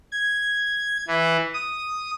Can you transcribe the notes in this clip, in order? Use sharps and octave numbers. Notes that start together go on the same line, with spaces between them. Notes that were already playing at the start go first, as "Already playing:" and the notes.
G#6
E3
D#6